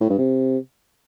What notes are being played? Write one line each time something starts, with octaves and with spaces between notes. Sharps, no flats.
A2
G2
C3